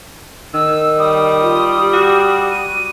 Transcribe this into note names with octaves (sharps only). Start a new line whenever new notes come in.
D#3 E6
G3 D#6
F4
G4
F#4
D#7